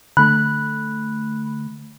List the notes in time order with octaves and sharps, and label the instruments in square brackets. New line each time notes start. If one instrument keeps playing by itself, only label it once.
[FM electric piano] D3 A3 [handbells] B5 F#6